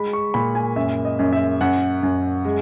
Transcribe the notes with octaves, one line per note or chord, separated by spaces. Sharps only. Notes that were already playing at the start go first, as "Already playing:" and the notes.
Already playing: G#3 B5
C#6
A#2 B5
G#5
F#2 E5
D#5
F#2
E5
F#2 F#5
F#2
G#3